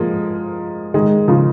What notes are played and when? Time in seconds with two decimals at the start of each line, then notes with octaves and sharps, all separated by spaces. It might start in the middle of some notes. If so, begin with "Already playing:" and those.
Already playing: F3 G#3 A#3
0.94 D#3 G#3
1.28 C#3 F3